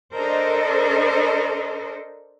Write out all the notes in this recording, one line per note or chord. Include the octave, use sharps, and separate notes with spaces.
D4 A4 A#4 C5 D#5